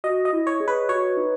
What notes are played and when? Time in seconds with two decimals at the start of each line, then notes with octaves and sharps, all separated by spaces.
0.04 F#4 D#5
0.25 D#5
0.33 E4
0.47 C#5
0.60 G#4
0.68 B4
0.89 F#4 C#5
1.17 D#4